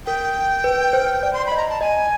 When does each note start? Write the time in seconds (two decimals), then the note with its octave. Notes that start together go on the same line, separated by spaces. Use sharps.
0.06 A#4 G5
0.64 B4
0.93 C5
1.23 D5
1.33 C6
1.46 B5
1.52 D#5
1.57 A#5
1.69 A5
1.81 D#5 G#5